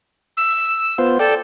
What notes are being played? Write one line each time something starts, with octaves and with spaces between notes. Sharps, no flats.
E6
B3 F4 C5
A4 D5 G5